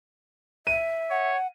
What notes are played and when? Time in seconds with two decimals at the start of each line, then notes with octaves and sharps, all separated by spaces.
0.67 E5 D#7
1.10 C#5 F#5